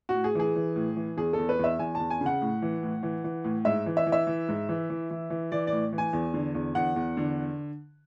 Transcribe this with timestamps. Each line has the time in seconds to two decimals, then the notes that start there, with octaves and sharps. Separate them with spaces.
0.09 F#4
0.14 A2
0.24 G#4
0.35 E3 G#4
0.56 E3
0.76 A2
0.97 E3
1.17 E2 G#4
1.33 E2 A4
1.49 B4
1.59 E2 E5
1.79 E2 G#5
1.95 E2 A5
2.10 G#5
2.21 C#3
2.26 F#5
2.42 A2
2.62 E3
2.83 A2
3.03 E3
3.24 E3
3.44 A2
3.65 G#2 E5
3.86 E3
3.97 E5
4.06 E3
4.12 E5
4.27 E3
4.49 G#2
4.69 E3
4.90 E3
5.10 E3
5.30 E3
5.52 E3 D5
5.67 D5
5.72 A2
5.93 E3
5.98 G#5
6.13 E2
6.34 D3
6.54 E2
6.75 E2 F#5
6.96 E2
7.17 D3